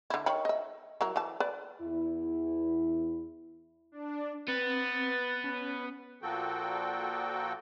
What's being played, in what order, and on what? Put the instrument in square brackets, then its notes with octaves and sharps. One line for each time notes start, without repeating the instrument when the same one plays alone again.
[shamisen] D3 E4
D#3 C#5 B5
D#5 E5
F#3 E4 A#4
E3 A5
B4 D5
[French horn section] E2 E4
[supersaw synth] D4
[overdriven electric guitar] B3 [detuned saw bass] C4 [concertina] B4 [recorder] A6
[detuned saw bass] C#4
[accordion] A#2 F3 A#3 F#4 A4 G5